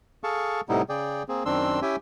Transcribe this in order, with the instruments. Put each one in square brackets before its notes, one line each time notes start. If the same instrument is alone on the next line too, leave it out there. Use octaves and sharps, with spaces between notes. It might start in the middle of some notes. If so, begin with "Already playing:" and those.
[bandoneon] G#4 A4 F5 A5 C#6
A2 C3 G3 B3 D#4 E4
C#3 G#4 D5 G5
A#3 C4 G#4
F#2 D#3 C4 D4 C6 E6
C#4 E4 G4 E5 G5 G#5